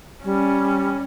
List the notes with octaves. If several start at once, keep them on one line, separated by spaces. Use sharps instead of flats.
G3 C#4